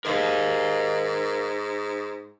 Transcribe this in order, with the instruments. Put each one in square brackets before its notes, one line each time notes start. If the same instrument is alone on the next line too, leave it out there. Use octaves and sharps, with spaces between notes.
[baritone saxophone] G#2 [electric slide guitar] A#4 D#5 F5